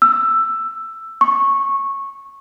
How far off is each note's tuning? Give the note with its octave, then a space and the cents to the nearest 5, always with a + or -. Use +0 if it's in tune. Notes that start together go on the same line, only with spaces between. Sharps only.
E6 +10
C#6 -15